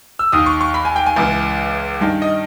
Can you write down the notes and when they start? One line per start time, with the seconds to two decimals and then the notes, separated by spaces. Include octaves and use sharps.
0.19 E6
0.32 D#2 D#3 D#6
0.46 C#6
0.61 C#6
0.74 B5
0.85 G#5
0.96 G5
1.06 G#5
1.16 C#2 C#3 E3
2.01 G2 D#3
2.22 D#5